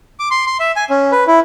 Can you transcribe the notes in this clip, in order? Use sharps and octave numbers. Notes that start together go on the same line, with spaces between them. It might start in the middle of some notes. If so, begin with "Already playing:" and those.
D6
C6
C6
E5
G#5
C#4
B4
E4